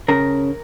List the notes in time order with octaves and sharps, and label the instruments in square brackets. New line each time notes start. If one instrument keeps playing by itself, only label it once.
[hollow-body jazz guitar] C#3 A#4